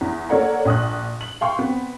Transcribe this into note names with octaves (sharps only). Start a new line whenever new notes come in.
E2
A#3 A4 C#5 D5 F#5 A#5
A#1 D#6 F#6
F#7
F5 G5 C6 C#6
B3 C4